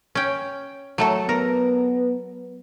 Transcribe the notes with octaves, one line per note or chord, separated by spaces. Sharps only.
C#4 G5
F#3 A3 A4
B3 A#4